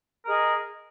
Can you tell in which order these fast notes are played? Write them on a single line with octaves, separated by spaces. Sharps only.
A#4 G#4 D#5